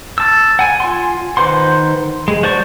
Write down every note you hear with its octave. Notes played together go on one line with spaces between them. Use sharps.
A5 E6
F#5 G#5
F4 G#5 C6
D#3 B4 C5 F#5 C6
G#3
F#4 C5 D5 A5 C#6